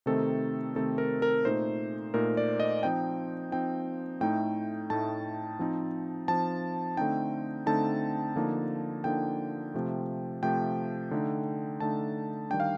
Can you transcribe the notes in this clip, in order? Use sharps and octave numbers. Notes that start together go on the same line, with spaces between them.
C3 D#3 A3 C4 D#4 A4
C3 D#3 A3 C4 D#4 A4
A#4
A#4
A#2 A3 D#4 C5
A#2 A3 D#4 A#4
D5
D#5
F3 C4 D#4 G5
F3 C4 D#4 G5
A2 A3 D#4 G5
A2 A3 D#4 A5
F3 C4 D#4
F3 C4 D#4 A5
D3 A3 C4 D#4 G5
D3 A3 C4 D#4 A5
D3 F3 A#3 D#4
D3 F3 A#3 D#4 G5
C3 F3 A3
C3 F3 A3 G5
D3 A3 D#4
D3 A3 D#4 A5
D#3 G3 D4 G5
F5